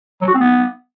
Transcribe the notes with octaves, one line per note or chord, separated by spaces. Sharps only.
F#3
F#4
C4
B3